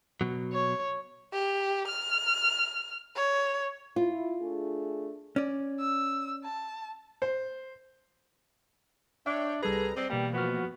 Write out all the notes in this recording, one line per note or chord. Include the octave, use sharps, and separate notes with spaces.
B2 F#3
C#5
G4
F6
C#5
E4 F4
A3 D4 G#4
C#4 D5
E6
A5
C5
D4 C#5 E5 G5
C2 G3 G#4 A4 B4 A#5
C4 D5 D#5 F#5
B2 E3 G3 A#3 G5
F3 B3 F#4 F6